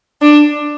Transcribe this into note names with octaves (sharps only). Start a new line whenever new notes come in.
D4